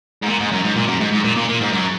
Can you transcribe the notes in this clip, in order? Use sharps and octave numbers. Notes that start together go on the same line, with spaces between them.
G#2
A#2
G#2
F#2
G#2
A#2
F#2
G#2
G#2
A#2
A#2
A#2
G#2
F#2